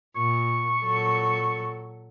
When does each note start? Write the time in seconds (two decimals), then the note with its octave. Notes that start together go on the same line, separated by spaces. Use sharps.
0.16 A#2 C#6
0.83 A#2 F#3 A4